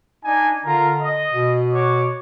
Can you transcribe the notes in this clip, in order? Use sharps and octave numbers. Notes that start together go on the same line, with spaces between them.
D4 D#4 G#5
D3 F4 A#4 A#5
D#5
B2
F#4 C#5 D6